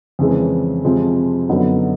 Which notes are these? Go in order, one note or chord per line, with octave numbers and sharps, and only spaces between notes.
F2 C#3 E3 G#3
F2 C3 F3 G#3
F#2 D3 F#3 B3 D#4